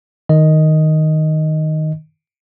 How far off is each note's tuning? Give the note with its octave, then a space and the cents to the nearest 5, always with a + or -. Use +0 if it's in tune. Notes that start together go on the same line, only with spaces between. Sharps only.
D#3 +0 D#5 +0